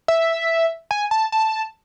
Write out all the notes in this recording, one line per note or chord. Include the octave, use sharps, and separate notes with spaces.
E5
G#5
A5
A5